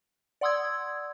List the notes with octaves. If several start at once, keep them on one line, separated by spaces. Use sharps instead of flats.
D5 F#5 C6 D#6 E6 G#6